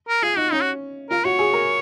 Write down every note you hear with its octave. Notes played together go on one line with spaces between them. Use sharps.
A#4
F4 G#4
D#4 F#4
C#4 D#4
F#4
F4 A#4
F#4 C#5
G#4
A#4